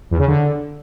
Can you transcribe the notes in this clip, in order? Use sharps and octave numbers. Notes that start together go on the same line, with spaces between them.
E2
C#3
D3